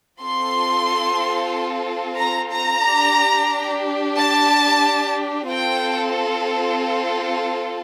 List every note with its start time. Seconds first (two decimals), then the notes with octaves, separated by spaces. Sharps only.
0.20 C4 F4 A4 C6
2.19 A#5
2.52 A#5
2.86 D4 G4
4.17 A5
5.50 C4 F4 A4 G5